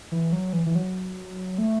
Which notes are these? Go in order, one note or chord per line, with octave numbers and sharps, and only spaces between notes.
E3
F#3
E3
E3
F#3
A3